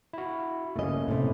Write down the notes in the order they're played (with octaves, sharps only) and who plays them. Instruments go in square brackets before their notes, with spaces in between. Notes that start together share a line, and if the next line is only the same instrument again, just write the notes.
[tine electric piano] E4 F#4
[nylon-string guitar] C#3 D#5 [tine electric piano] A3 A#3 C#4
[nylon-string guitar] A2 C3